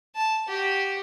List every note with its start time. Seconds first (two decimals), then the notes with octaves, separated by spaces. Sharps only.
0.15 A5
0.48 F#4 G4